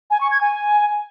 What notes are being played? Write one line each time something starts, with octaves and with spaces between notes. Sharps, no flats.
G#5
C#6
G#6
G#5